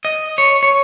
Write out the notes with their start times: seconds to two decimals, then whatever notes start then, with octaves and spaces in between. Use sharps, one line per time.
0.05 D#5
0.38 C#5
0.63 C#5